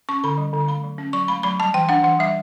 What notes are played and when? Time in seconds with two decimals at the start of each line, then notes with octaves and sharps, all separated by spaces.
0.09 C#4 C#6
0.24 D3 B5
0.38 G3
0.53 D3
0.68 A3 B5
0.84 F#3
0.98 C#4
1.13 F#3 C#6
1.28 A3 B5
1.43 F#3 B5
1.60 G3 A5
1.74 E3 G5
1.89 D4 F#5
2.04 E3 F#5
2.19 G3 E5